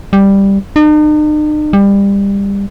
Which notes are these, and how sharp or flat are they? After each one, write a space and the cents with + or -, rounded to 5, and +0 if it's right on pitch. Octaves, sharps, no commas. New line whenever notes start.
G3 +5
D#4 -45
G3 +25